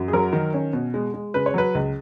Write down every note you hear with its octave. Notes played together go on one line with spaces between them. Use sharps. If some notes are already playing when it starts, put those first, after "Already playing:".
Already playing: F#2
G#4
F#3 A#4
D#3
C#4
B2
G#3
G#3
C#3 B4
C#5
F#3 B4
C#2